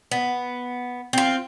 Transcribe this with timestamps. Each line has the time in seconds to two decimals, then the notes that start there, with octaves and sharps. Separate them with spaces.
0.12 B3
1.13 C4 F4